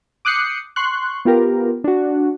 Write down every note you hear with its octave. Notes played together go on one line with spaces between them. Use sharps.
D6 D#6 F#6 G6 C7 C#7
C6 C#6 F#6
B3 F4 G4 A#4
D4 F#4